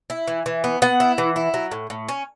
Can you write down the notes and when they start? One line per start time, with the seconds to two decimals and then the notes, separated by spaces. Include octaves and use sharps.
0.10 E4
0.27 E3
0.46 E3
0.64 B3
0.82 B3 F#5
1.00 E4
1.18 E3
1.36 E4
1.54 F#3
1.71 A2
1.90 A2
2.09 C#4